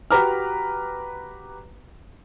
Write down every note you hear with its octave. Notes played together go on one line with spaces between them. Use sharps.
F#4 G4 B4 A#5 D6 F6